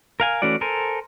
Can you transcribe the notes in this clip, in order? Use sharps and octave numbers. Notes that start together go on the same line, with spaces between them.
A#4 F5 G#5
E3 A3 C#4 F#4 D5
A4 A#4 C5 G#5